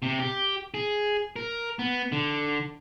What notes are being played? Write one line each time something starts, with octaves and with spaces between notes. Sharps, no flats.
C3
G4
G#4
A#4
B3
D3